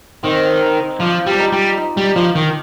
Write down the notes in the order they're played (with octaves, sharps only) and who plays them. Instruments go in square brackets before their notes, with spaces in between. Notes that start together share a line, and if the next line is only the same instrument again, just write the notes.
[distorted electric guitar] D#3 [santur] C4
[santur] D#4
[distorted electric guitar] F3 [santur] D4 F4
[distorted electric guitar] G3 [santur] D4
[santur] D#4
[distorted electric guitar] G3
[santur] D#4
[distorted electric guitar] G3
[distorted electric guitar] F3 [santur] D4
[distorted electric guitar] D#3